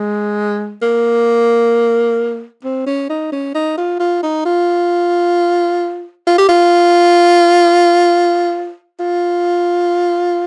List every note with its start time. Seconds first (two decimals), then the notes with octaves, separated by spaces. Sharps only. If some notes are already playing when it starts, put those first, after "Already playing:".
Already playing: G#3
0.82 A#3
2.64 C4
2.86 C#4
3.10 D#4
3.32 C#4
3.55 D#4
3.78 F4
4.00 F4
4.23 D#4
4.45 F4
6.27 F4
6.38 G4
6.49 F4
9.00 F4